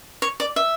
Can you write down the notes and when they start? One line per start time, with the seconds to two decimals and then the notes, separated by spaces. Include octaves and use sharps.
0.22 C#5
0.40 D5
0.56 E5